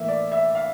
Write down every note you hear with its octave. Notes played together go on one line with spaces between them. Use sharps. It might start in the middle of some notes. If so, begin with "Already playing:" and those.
Already playing: A2 E3 A#3 E5
D5
E5
F5